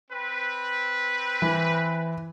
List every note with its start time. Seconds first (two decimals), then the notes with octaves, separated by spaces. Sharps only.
0.11 C4 B4
1.42 E3